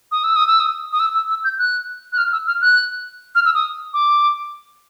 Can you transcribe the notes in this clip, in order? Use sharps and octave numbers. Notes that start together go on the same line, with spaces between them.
D#6
E6
D#6
E6
D#6
D#6
E6
E6
E6
G6
F#6
F#6
F6
E6
F6
F#6
F6
E6
D#6
D6